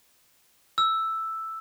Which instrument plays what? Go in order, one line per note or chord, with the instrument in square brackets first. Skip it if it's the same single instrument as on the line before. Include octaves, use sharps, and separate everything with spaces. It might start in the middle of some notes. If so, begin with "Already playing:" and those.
[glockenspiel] E6